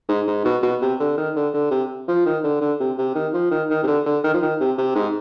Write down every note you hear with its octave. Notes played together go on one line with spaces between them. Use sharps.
G#2
G#2
B2
B2
C3
D3
D#3
D3
D3
C3
F3
D#3
D3
D3
C3
C3
D#3
F3
D#3
D#3
C3
D3
D3
D#3
F3
D#3
C3
C3
G#2